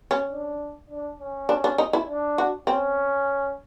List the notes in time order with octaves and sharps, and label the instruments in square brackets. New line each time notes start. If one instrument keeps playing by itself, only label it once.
[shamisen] C#4
[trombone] D4
D4
C#4
[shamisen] D4
D4
D#4
E4
[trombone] D4
[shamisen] F#4
[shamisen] C4 [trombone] C#4